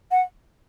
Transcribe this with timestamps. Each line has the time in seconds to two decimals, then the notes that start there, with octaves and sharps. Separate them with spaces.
0.11 F#5